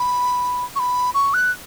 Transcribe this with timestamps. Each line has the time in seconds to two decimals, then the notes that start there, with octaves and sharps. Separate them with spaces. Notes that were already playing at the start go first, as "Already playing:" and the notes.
Already playing: B5
0.76 C#6
0.79 B5
1.14 C#6
1.34 F#6